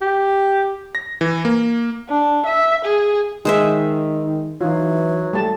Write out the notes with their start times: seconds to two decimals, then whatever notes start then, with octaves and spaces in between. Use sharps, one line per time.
0.01 G4
0.95 A#6
1.21 E3
1.45 A#3
2.09 D4
2.46 E5
2.85 G#4
3.45 D#3 G#3 C5 E5
4.61 E3 F#3 D#4 F4
5.33 G3 A3 A5